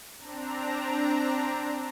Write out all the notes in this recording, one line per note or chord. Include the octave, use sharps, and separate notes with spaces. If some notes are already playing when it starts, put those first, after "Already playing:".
C4 D4 A#5